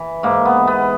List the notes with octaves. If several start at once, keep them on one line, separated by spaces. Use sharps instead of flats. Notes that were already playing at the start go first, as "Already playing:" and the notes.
Already playing: E3
G#2 A#3
B3
E3
B3